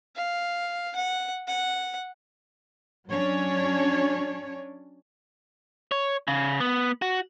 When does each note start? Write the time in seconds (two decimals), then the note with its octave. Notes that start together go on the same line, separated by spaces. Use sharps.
0.16 F5
0.96 F#5
1.48 F#5
3.08 F#3 C#4 D4 C#5
5.92 C#5
6.28 C#3
6.61 B3
7.02 F#4